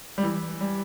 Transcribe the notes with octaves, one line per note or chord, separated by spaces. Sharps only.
G3
E3
G3